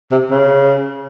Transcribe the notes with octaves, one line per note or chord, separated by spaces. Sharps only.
C3
C#3